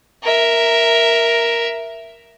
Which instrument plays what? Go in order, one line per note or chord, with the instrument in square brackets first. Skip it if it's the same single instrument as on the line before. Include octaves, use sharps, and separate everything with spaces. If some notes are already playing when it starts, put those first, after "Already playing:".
[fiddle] A#4 E5